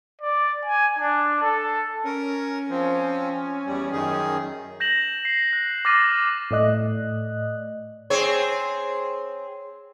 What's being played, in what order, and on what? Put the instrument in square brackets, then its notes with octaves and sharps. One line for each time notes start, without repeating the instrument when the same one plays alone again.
[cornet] D5
G#5
D4
A4
[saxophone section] C#4 [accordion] A#4
[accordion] F3 C4
E2 G3
F#2 D#3 G#4
[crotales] G6 A#6 E7 F#7
C7
F#6
D6 F6 A6 A#6 C7 D#7
[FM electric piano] A2 A3 D5 D#5 F#6
[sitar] C4 G#4 C#5